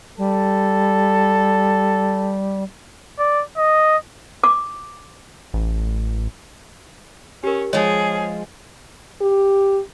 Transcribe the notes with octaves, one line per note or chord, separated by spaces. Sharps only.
G3 A4
D5
D#5
D6
A1
C#4 G4 A#4
F3 G#3 G#4 C#5
G4